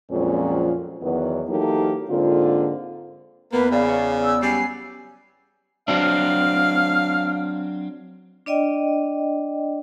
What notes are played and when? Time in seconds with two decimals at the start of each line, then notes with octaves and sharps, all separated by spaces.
0.11 F2 A#2 F#3 G#3 C4 C#4
1.02 E2 D#3 F#3 B3
1.49 E3 F#3 A#3 D#4 G4 A4
2.10 G#2 D3 A#3 C4 F4
3.52 E2 A#3 B3 B4
3.71 C#3 D5 F5
3.89 C#5
4.24 E6
4.42 F#3 G3 C#4 G#5 C7
5.88 F#3 C4 D4 F5
8.46 D4 D5 D#5 G5